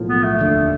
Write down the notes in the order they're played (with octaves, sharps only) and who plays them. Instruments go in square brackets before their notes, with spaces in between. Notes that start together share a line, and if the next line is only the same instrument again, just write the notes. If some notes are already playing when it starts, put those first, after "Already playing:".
Already playing: [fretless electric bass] B1 A2 F3 A#3
[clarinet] B3
A3
[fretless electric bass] F1 D#2 D3